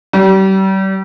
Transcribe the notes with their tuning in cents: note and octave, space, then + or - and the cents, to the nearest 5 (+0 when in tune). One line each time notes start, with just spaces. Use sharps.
G3 -35